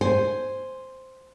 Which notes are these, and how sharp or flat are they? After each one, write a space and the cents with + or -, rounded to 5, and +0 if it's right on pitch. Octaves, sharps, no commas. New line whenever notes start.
C5 +0 G#5 +0